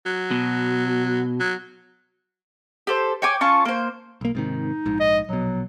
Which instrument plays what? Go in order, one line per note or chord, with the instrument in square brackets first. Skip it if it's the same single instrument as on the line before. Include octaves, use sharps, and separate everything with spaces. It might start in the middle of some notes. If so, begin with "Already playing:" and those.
[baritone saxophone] F#3
[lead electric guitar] B2
[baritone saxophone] F#3
[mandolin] G4 A4 C5
C#5 G5 G#5 D6
C#4 F4 A5 C#6
A#3 C5
[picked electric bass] B1 A#3
[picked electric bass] G#2 C3 D#3 [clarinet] D#4
[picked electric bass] A#1 G#2
[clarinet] D#5
[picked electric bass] A#1 B2 [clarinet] F#3